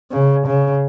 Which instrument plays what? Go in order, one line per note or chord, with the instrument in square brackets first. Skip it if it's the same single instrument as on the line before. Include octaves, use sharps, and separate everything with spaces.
[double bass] C#3
C#3